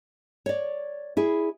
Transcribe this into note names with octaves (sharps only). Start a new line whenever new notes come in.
C#5 D5
E4 G#4